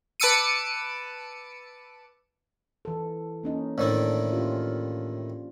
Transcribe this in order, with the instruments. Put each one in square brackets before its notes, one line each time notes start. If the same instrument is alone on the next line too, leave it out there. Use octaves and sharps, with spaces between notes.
[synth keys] B4 A5 D6 E6 C#7 D#7
[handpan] E3 A4
A#3 C#4 D#4
[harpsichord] A2 D#3 E4 [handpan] D4 C5 D5
[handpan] C#4 F4 G4